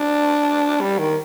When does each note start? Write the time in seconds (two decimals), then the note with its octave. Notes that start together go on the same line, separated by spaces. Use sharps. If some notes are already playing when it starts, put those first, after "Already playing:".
Already playing: D4
0.81 G3
0.99 D#3